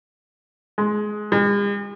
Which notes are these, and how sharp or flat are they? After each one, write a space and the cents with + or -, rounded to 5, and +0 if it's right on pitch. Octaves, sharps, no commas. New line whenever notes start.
G#3 +20
G#3 -45